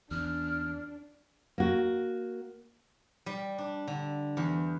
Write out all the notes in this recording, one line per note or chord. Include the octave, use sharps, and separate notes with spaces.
E2 D4 F6
A#3 F#4
G3
D4
D3
E2